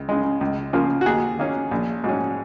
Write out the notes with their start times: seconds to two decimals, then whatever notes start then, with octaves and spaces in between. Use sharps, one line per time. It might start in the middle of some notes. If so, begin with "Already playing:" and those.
Already playing: C#2
0.09 C#3 G#3
0.41 C#2
0.73 C#3 F3 A#3
1.01 F#4
1.06 D#2 G#4
1.39 D#3 A#3 C#4
1.71 A#1
2.04 G#2 F#3 C#4